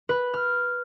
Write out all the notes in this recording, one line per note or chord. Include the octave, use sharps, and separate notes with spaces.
B4
F6